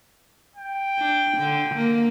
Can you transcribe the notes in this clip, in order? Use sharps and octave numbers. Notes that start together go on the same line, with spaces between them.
G5
D4
D3
A#3